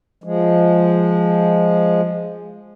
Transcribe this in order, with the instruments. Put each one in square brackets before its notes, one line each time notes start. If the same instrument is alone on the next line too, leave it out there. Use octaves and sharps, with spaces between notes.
[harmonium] F3 G#3